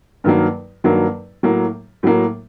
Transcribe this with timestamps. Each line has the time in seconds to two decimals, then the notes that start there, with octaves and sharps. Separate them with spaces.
0.24 G2 D#3 F#3 A#3
0.84 G2 D#3 F#3 A#3
1.43 A2 F#3 A#3
2.03 A2 F#3 A#3